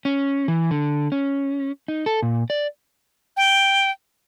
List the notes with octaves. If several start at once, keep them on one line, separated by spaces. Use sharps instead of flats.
C#4
E3
D3
C#4
D#4
A4
A#2
D5
G5